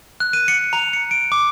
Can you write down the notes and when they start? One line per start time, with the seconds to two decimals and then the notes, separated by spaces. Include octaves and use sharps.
0.20 F#6
0.33 D#7
0.48 C#7
0.73 A#5
0.93 C#7
1.11 D7
1.32 D6